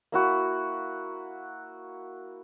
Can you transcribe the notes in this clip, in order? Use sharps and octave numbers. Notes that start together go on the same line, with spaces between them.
A#3 E4 F#4